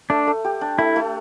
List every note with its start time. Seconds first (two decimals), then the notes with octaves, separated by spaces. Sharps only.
0.10 A3 D4
0.27 A3
0.44 G4
0.61 D4
0.79 A3 E4
0.96 A3